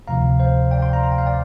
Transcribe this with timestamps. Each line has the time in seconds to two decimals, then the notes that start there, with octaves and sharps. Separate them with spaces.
0.08 D2 C3 F3 F5 A#5
0.40 C5 F5
0.71 D5 G5
0.82 G5 C6
0.93 F5 A#5
1.04 A#5
1.12 G5
1.18 F5
1.26 D5 G5